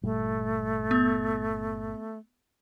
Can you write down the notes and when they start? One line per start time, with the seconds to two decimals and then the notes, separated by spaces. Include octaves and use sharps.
0.03 G1 A#2 G3 A3
0.91 B3